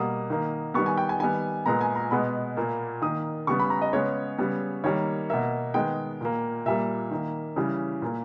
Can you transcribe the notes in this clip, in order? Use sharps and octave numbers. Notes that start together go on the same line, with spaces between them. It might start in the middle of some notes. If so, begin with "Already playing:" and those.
Already playing: B2 G3 A#3 D#6
D#3 A#3
D#3 G3 B3 C#6
G#5
G5
G#5
D#3 G3 B3 G#5
A#2 G#3 B3 A#5
G#5
A#5
B2 G#3 B3 B5
A#2 A#3
D#3 A#3 D#6
C#3 G3 B3 C#6
B5
A#5
D#5
C#3 G#3 B3 C#5
C#3 G3 B3
D#3 G3 A#3 C#5
B2 A#3 E5
D#3 G#3 B3 G5
A#2 A#3
A#2 G3 A#3 E5
D#3 A#3
C#3 E3 G3
A#2 A#3